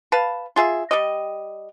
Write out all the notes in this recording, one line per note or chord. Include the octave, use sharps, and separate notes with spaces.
B4 F5 A5
F4 G#4 E5
G3 G4 D#5